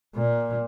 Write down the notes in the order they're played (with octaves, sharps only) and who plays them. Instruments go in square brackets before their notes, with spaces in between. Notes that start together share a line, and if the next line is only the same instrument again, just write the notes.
[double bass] A#2